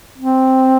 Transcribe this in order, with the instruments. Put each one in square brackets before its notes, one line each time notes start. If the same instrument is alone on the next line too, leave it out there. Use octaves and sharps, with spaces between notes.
[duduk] C4